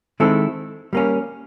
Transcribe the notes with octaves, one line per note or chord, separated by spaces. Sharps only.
D#3 G#3 C4 E4 A4
G3 A#3 C#4